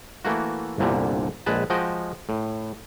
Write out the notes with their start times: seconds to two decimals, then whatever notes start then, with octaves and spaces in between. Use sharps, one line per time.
0.25 E3 A3 A#3 F#4
0.78 G1 C2 A#2 D3 G3
1.46 A#1 G#3 B4 A5
1.70 F3 G#3 F#4 D#5 G5
2.29 A2